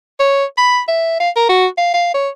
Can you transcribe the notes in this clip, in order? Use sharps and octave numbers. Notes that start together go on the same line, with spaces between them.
C#5
B5
E5
F5
A#4
F#4
F5
F5
C#5